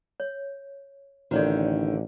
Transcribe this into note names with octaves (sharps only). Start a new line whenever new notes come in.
C#5
A1 D3 D#3 F#4 C#5 D5